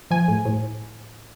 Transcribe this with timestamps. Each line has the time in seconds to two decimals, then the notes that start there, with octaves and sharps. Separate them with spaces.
0.11 F3 G#5
0.28 A2
0.45 A2